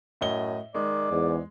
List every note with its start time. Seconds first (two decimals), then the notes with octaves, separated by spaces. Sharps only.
0.21 F#2 A2 D#5 G7
0.75 D#3 G#3 D5
1.12 E2 G#2